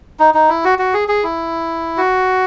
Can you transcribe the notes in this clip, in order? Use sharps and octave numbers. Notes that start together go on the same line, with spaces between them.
D#4
D#4
E4
F#4
F#4
G#4
G#4
E4
F#4